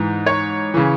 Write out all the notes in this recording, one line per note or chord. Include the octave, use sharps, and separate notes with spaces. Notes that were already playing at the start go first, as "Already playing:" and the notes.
Already playing: G#2 E3
C#5
C#3 E3